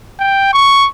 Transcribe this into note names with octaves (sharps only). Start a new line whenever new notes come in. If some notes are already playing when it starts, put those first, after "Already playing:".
G5
C#6